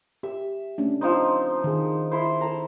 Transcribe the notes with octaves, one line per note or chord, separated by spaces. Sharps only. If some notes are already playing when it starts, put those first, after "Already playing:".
G4 E5
A3 C#4 D4
F3 C4 D#4
D#3 G#4
E4 C5
A4 A#5